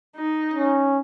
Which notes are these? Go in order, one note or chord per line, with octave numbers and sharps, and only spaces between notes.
D#4
C#4